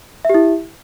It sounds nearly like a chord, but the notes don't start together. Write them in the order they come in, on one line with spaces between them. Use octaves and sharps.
E5 G4 E4